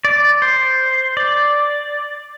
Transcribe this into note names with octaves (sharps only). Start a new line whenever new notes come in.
D5
C5
D5